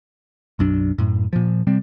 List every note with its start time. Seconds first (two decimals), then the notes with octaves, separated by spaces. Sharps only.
0.59 B1 F#2 D4
0.98 F#2 A2
1.33 A#2 F3
1.67 C3 G3 C4